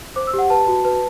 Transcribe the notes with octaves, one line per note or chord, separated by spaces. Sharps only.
C5 D6
E6
G4 F#5
B4 A5
F#4
B4